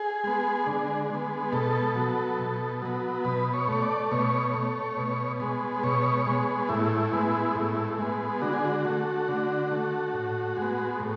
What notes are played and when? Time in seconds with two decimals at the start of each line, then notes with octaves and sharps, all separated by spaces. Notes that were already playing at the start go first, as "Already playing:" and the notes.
Already playing: G#4
0.24 G#3 B3
0.67 D3
1.10 G#3 B3
1.53 B2 A4
1.95 F#3 B3
2.39 B2
2.82 F#3 B3
3.25 B2 B4
3.54 C#5
3.68 A3 C#5
3.82 D5
4.11 B2 C#5
4.54 A3
4.97 B2
5.40 G#3 B3
5.83 B2 C#5
6.27 G#3 B3
6.69 A2 E4
7.13 G#3 B3
7.55 A2
7.98 G#3 B3
8.42 D3 F#4
8.53 G#4
8.65 F#4
8.85 A3
9.28 D3
9.71 A3
10.14 A2
10.57 G#3 B3
11.00 A2